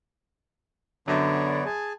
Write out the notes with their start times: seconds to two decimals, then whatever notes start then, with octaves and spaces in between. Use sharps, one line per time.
1.08 F#2 D3 B3 C#5 D5
1.66 G#4 G#5 A5